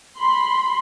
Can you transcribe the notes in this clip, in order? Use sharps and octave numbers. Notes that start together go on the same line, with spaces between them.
B5 C6